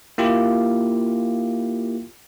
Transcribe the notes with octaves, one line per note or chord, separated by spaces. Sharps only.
A#3 E4 F4 G4